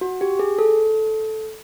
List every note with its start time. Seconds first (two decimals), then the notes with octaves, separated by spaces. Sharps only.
0.01 F#4
0.21 G4
0.39 G#4
0.58 A4